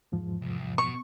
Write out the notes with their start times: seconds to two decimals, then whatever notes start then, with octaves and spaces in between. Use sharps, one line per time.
0.12 E2 G#2 F3
0.42 C2
0.78 B2 C#6